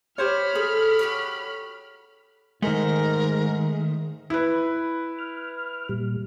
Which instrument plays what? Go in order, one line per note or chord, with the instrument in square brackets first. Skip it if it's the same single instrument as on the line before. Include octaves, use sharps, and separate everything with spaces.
[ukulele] G4 C5 C#5 [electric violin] B5 F6
[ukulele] G#4 [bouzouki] A4
[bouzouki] F#4 G4 C#5
[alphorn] G#2 [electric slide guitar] D#3 A3 [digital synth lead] G#3 [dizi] A#4
[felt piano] E4 B4
[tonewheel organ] F6
A#2 G3